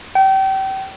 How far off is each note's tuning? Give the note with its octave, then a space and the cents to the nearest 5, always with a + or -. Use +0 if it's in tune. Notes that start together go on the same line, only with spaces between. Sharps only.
G5 -30